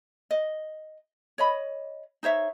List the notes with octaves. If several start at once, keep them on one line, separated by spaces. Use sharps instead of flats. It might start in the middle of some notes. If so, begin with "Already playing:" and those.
D#5
C#5 D#5 B5
D#4 C5 C#5 E5